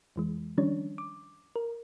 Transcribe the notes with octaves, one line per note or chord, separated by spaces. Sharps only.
F2 E3 G#3
D#3 F3 G3 C#4 D4 C#5
D6
A#4